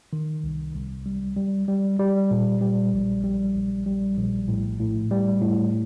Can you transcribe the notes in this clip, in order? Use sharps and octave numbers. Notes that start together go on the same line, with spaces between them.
D#3
C2
C2
G3
G3
G3
G3
A#2
G3
A#1
G3
A#1
G3
A#1
A2
A2
G3
A2